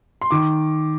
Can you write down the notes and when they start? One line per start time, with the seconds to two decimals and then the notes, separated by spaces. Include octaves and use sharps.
0.21 C6
0.31 D#3 D6